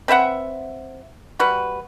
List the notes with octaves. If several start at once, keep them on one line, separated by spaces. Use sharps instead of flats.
C4 B4 E5 F#5
G3 F#4 B4